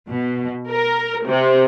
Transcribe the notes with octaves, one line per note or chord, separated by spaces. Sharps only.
B2
A#4
C3